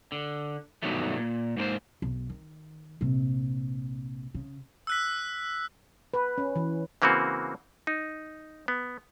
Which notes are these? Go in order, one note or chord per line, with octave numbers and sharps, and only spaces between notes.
D3
G2 B2 D#3 F#3 G3 A3
A#2
G#2 A#3 A#4 C5
B1
D#3
A#1 C3
C#3
E6 F#6 B6
B4
C#4
E3
C#3 E3 A#3 C4 F#4
D#4
B3